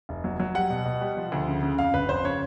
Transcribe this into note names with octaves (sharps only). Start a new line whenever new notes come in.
F1
F#3
F#3
G3 F#5
B2
B2
G3
F3
D2
C#3
C#3
F2 F5
G1 B4
F2 C5
C#3 C#5